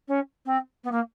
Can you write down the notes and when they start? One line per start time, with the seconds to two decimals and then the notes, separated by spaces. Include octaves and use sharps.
0.08 C#4
0.46 C4
0.84 B3
0.92 A#3